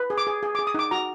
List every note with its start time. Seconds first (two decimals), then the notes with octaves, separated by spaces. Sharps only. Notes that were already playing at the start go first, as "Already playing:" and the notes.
Already playing: B4
0.10 G#4
0.18 D6
0.27 G#4
0.43 G#4
0.55 G#4 D6
0.67 D#6
0.74 D#4 D6
0.91 F#4 A#5